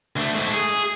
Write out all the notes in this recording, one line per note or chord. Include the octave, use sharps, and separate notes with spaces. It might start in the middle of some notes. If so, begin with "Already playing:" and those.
D2 A3
G#2 A3
G#4